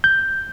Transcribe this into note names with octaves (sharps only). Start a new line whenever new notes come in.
G6